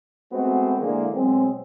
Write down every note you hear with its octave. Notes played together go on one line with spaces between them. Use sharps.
G#3 A3 B3 C4 F#4 C5
D3 E3 G#3 A#3
B2 F#3 G#3 C4